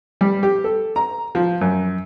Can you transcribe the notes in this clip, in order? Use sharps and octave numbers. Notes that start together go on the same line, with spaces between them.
G3
G4
A4
A#5
F3
F#2